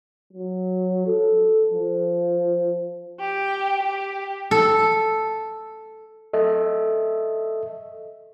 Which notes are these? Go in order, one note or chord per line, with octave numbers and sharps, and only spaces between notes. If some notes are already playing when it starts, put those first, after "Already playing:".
F#3
A4
F3
G4 G5
G4
A4
A4 D#5 E5